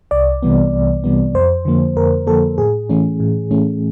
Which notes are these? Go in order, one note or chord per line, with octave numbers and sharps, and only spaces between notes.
C2 D5
C3 E3 G3 B3
C2
C3 E3 G3 B3
F2 C5
D3 F3 A#3
F2 A#4
D3 F3 A#3 A4
A2 G#4
E3 A3 C#4
A2
E3 A3 C#4